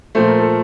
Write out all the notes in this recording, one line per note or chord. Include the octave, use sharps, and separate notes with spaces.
A#2 F3 A3 C5
A#4
A4